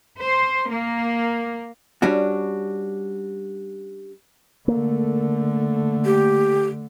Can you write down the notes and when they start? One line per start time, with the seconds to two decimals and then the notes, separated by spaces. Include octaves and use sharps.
0.21 C5
0.72 A#3
2.02 G3 C#4 D4 F#4
4.68 D3 A3 A#3
6.05 G4